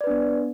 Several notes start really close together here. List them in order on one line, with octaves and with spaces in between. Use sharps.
D5 B4 D4 B3